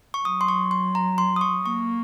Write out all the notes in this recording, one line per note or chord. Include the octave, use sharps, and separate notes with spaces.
C#6
F#3 D#6
C6
C#6
C6
A#5
C6
D#6
C#6
A#3 C#6